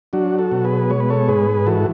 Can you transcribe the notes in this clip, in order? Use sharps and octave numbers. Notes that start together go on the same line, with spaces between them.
F#3 D4 F#4
F#4 A4
B2
G#4 B4
G#3 C#5
B4
A4 C#5
G#2 G#4 B4
E3 F#4 A4